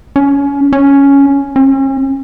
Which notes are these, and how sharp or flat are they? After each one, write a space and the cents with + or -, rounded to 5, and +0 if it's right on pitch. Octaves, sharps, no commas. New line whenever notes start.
C#4 +25
C#4 +5
C#4 -40